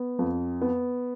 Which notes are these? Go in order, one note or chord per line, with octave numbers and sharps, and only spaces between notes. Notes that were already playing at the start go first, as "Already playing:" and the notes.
Already playing: B3
F2
B3